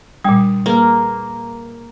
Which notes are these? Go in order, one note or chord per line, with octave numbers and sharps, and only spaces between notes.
A#2 G3 D4 G5 D#6
A#3 G#4 B4